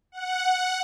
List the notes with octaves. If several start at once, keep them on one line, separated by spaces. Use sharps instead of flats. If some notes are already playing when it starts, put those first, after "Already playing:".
F#5